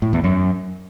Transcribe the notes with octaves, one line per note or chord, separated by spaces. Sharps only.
A2
E2
F#2